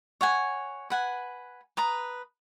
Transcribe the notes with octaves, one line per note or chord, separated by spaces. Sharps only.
C#5 F#5 G#5
B4 F#5 G#5
B4 A#5 D#6